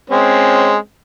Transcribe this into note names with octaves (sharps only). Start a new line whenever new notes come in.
G#3 C4 C#4